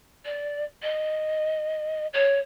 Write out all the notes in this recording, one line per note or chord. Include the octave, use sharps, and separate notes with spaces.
D5
D#5
C#5